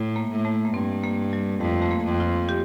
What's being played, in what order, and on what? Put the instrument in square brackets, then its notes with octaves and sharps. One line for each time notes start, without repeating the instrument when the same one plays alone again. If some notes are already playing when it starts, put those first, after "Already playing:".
Already playing: [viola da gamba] A2
[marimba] A#3
[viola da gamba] A2
[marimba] A3
A#3
[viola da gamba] G2 [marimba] C4
[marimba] A#3
G3
[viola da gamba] F2 [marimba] A3
[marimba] A3
A#3
[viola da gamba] F2
[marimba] F4
G4